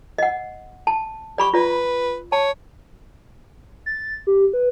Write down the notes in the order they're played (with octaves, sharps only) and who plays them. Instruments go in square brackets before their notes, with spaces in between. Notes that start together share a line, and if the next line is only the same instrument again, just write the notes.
[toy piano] D#5 F#5
A5
[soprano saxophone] G4 [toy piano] D5 B5 C#6
[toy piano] F4 D5 [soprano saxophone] B4
[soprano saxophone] C#5 [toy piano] A5
[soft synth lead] A6
G4
B4